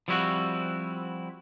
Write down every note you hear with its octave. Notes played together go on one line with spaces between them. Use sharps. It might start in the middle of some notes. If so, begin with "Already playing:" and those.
F3 G3 C4 E4 F#4